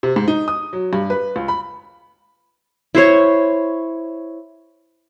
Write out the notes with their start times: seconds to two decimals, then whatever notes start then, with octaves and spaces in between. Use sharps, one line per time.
0.03 C3
0.16 G#2
0.28 D#4
0.48 D#6
0.73 F#3
0.93 G2
1.10 B4
1.36 C#2
1.48 B5
2.95 E4 C5 C#5